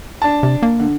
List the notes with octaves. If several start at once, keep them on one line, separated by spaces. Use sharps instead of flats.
D4 A5
C3
A#3
D3